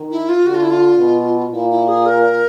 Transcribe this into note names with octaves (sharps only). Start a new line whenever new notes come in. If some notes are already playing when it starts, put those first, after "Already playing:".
Already playing: D#3
E4
F4
D3 F#4
F4
E4
F4
B2
A#2 E4
E4
G#4
A#4